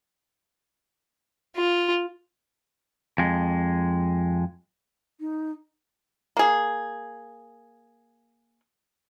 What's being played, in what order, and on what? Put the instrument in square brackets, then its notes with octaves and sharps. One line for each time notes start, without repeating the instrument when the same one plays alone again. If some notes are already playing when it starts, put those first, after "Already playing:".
[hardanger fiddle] F4
[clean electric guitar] F2 G#3
[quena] D#4
[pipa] A#3 G#4